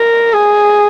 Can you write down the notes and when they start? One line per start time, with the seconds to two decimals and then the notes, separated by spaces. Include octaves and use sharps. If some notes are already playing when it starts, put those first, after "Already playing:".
Already playing: A#4
0.33 G#4